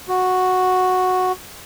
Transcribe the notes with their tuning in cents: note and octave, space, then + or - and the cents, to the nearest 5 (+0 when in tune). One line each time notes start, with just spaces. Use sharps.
F#4 -5